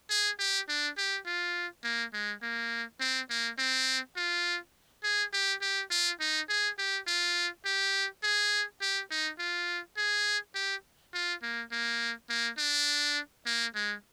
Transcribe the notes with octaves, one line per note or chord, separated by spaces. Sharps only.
G#4
G4
D4
G4
F4
A#3
G#3
A#3
C4
A#3
C4
F4
G#4
G4
G4
F4
D#4
G#4
G4
F4
G4
G#4
G4
D#4
F4
G#4
G4
F4
A#3
A#3
A#3
D4
A#3
G#3